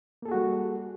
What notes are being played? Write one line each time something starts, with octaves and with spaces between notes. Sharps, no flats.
G3 A#3 F#4 G#4 A4